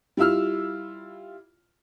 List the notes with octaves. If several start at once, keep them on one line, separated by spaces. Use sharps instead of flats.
G3 E4 F4 E6 F6